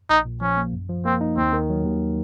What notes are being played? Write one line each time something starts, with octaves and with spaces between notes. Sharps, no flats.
A#1 D#4
A#2
F3 C#4
A#3
F#2
F3
A#3 C4
D#4
D#2 C4
D#3
F#3
D#2